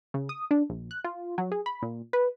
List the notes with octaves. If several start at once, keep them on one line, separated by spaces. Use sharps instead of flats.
C#3
D#6
D4
A#1
F#6
F4
F#3
G#4
B5
A#2
B4